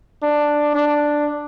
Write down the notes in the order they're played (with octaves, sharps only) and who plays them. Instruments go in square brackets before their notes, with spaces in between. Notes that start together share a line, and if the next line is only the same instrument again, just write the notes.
[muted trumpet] D4
D4